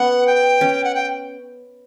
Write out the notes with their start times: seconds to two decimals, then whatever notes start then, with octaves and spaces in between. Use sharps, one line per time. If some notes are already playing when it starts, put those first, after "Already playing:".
Already playing: B3 C#4 F#5
0.27 G5
0.61 C#4
0.84 F#5
0.95 G5